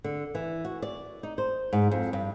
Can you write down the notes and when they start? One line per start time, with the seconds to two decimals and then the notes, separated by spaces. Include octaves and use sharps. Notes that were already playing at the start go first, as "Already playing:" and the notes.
0.04 D3
0.35 E3
0.65 F#4
0.82 D5
1.23 D#4
1.38 C5
1.73 G#2
1.91 F2
2.13 G2